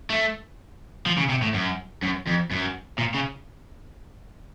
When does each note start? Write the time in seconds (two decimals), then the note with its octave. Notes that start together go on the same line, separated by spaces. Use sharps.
0.10 A3
1.06 F3
1.18 C#3
1.29 C3
1.42 A2
1.54 F#2
2.02 F#2
2.27 F2
2.51 F#2
2.98 A#2
3.14 C#3